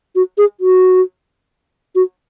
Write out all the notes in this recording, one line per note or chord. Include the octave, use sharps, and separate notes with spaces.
F#4
G#4
F#4
F#4